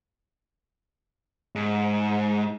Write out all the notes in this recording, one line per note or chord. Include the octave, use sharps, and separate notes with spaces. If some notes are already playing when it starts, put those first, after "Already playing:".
G#2